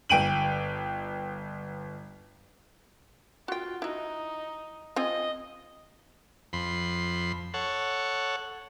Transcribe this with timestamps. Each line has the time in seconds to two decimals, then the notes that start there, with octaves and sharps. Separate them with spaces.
0.09 G1 G5 D7 D#7 F#7
3.48 F4 F#4 G5
3.82 D#4 E4 F#4
4.96 C4 F4 D#5 G#5
6.53 F2 B5 C6
7.54 A4 C#5 F#5